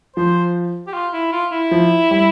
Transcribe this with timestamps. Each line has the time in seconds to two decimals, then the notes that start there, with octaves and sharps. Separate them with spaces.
0.16 F3 C5
0.87 G4
0.94 F4
1.14 E4
1.32 F4
1.52 E4
1.71 F3
2.11 G3